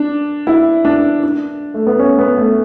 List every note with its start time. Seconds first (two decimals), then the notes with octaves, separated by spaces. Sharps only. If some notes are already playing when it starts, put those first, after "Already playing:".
Already playing: D4
0.47 E4
0.85 D4
1.23 D4
1.74 A3
1.87 B3
1.99 C#4
2.19 B3
2.37 A3